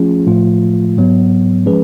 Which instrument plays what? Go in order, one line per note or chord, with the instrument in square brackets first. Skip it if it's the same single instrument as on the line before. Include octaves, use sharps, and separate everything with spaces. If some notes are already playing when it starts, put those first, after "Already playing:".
Already playing: [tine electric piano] F3 A3 C#4 F4 G#4
A2 F3 A3 F4
G#2 F#3 B3
F3 G#3 C#4 G#4 B4